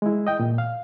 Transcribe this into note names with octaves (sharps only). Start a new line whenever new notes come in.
G#3 E4
D#5 G5
A#2
F5